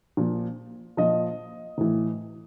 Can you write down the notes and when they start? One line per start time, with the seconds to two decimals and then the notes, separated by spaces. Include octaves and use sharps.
0.17 A#2 F3
0.97 A#2 F3 D#5
1.78 A2 E3